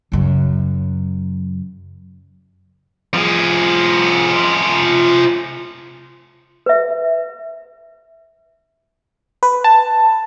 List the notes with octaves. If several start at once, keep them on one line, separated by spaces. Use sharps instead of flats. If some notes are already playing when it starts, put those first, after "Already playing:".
F#2 C#3
F3 G#4
B4 E5
B4
A5